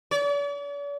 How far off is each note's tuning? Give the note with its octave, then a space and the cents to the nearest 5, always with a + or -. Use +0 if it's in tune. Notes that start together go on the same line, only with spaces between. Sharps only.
D5 -45